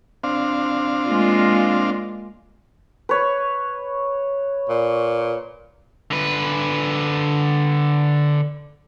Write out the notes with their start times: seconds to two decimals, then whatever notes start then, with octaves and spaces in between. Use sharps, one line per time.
0.24 C4 D4 F5
1.06 G#3 A#3 F4
3.09 B4 C#5
4.69 A#2
6.11 D3 B4